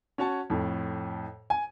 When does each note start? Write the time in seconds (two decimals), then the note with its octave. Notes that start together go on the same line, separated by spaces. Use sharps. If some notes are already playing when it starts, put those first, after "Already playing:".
0.18 C#4 F#4 C#5 A5
0.50 F2 A2
1.50 G#5